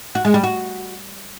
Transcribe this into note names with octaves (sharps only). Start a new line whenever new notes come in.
F#4
G#3
G3
F#4